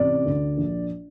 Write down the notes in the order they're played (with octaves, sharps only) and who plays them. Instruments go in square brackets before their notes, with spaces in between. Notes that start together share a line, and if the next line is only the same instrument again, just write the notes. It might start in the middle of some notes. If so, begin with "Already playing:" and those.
Already playing: [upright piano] A1 C3 D5
D2
A#1